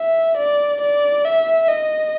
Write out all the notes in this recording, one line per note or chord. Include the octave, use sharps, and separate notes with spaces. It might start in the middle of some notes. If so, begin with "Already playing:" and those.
Already playing: E5
D5
D5
E5
D#5